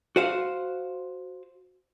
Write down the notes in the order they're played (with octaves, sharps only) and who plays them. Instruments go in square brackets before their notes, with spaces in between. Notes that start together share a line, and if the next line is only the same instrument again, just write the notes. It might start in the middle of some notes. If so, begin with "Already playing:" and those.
[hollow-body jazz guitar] F#4 C5 F5